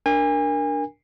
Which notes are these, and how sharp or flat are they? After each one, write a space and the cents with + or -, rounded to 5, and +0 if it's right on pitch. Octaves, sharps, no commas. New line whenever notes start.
D4 +0 A#4 +0 G#5 -35